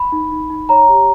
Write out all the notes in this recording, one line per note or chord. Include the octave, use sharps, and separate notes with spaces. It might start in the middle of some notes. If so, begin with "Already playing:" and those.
Already playing: B5
D#4
D#4
D#4
C#5 A#5
G4